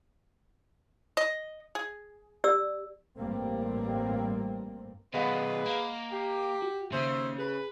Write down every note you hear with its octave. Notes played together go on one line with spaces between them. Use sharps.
D#5
G#4
G4 D5 E6
A1 G2 G3 A#3 C4
B2 D#3 G#3 G#4 B4 D#5 F5 F#5
A#3
G4
F#4
D#2 C#3 C5 E5
G#4 B4